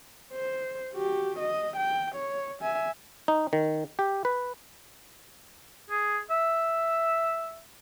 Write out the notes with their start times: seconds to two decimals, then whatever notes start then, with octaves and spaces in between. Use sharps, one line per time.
0.33 C5
0.94 F#4 G4
1.40 D#5
1.77 G5
2.16 C#5
2.61 E5 G#5
3.28 D#4
3.53 D#3
3.99 G4
4.25 B4
5.90 G#4
6.31 E5